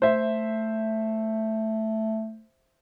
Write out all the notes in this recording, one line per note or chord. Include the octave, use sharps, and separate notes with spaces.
A3 C5 E5